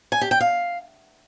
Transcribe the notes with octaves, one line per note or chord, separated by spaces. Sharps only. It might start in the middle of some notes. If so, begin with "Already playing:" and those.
G#5
G4
G5
F5